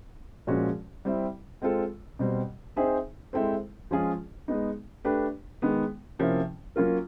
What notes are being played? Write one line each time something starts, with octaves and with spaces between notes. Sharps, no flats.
A#2 F3 G#3 C#4 F#4
G3 C4 E4
G#3 C4 F4 A4
B2 G3 C4
C4 D#4 G#4 C5 E5
G#3 C4 E4 A4 C5
F3 G#3 C#4 F4 G#4
G#3 B3 D#4
A3 D4 G4 B4
D#3 G#3 B3
C3 F3 A#3 C#4 E4
F#3 A#3 C#4 F4 A#4